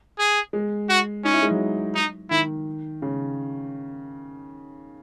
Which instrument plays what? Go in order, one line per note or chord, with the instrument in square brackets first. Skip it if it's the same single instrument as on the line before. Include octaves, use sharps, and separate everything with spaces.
[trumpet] G#4
[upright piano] G#3
[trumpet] F#4
[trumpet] C#4 [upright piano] D#4
[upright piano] E4
G#3
F#3
[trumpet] D#4
[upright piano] D#3 [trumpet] E4
[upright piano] C#3